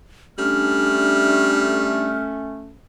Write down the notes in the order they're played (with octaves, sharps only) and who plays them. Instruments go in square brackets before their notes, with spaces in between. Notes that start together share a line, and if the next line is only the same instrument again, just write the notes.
[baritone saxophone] G3 [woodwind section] A3 C#4 [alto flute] D4 [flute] F6